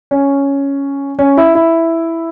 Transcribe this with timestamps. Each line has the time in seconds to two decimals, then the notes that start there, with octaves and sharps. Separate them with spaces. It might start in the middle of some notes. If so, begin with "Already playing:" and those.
0.11 C#4
1.19 C#4
1.37 E4
1.55 E4